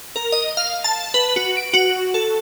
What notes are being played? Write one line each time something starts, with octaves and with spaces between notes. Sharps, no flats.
A#4
D#5
F5
A5
B4
F#4
D7
F#4
A4